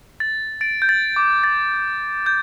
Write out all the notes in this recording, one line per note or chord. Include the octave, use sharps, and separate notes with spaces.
A6
A6 D7
G6
A6
D6
A6
G6